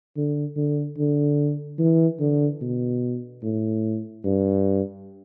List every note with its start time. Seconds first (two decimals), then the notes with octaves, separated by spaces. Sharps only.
0.17 D3
0.56 D3
0.98 D3
1.79 E3
2.20 D3
2.61 B2
3.43 A2
4.25 G2